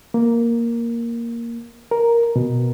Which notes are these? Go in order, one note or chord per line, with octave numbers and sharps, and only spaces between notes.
A#3
A#4
B2